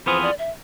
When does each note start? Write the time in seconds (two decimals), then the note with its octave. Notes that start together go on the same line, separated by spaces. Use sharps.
0.06 F2 E3 B3 F4 G#4 C5
0.23 D5
0.39 E5